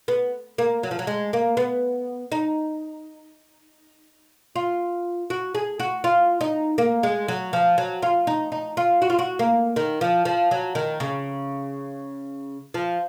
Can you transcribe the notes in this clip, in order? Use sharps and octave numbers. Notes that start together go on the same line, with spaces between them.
B3
A#3
F#3
F3
F#3
G#3
A#3
B3
D#4
F4
F#4
G#4
F#4
F4
D#4
A#3
G#3
F#3
F3
F#3
F4
D#4
D#4
F4
F#4
F4
F#4
A#3
D#3
F3
F3
F#3
D#3
C#3
F3